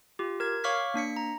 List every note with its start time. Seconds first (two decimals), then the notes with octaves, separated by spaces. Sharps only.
0.19 F4 G4
0.40 A#4 G#6
0.64 C#5 F5 C#6 D6 F6 B6
0.94 A#3 D4 B6 C#7
1.17 A#5